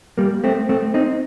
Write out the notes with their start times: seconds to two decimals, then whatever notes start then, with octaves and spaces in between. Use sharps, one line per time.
0.18 G3 A#3
0.44 A3 C4
0.69 A3 C4
0.94 C4 D#4